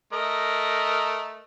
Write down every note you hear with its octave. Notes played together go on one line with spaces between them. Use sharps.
A3 A#4 D#5